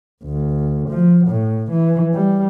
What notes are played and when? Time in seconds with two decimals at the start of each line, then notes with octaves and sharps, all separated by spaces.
0.23 D2
0.89 F3
1.28 A2
1.71 E3
2.14 G3